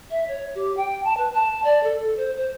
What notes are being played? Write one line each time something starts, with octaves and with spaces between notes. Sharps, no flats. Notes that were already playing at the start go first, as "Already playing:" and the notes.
E5
C#5
G4
G5
A5
B4
A5
D5
A4
A4
C5
C5